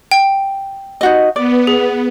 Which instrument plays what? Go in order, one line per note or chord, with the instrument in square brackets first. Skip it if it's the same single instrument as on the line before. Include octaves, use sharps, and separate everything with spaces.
[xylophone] G5
[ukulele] D#4 F#4 D#5
[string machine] B3 [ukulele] D5
[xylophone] G#4